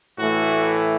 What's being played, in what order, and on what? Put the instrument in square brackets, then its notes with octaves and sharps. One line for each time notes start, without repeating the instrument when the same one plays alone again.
[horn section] A2 E3 A3 F#4